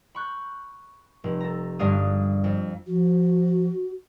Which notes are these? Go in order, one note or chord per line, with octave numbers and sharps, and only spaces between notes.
B5 C#6 F#6 G6
F1
A4 A#5
G1 G2 G#3 D4 F5 D#6
F2
F3 F#4